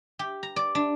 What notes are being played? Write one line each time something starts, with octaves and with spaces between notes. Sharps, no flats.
G4
A#5
D5
D4